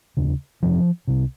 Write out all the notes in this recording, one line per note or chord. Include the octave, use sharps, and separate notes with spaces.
F1 D#2 C#3
G1 F2 C3 F3
C2 C3